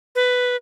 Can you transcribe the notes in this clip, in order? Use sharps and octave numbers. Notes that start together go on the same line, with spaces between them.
B4